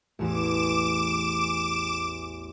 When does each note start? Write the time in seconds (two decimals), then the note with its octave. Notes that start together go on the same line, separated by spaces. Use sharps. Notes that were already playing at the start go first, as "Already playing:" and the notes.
0.19 A1 E2 D6 E7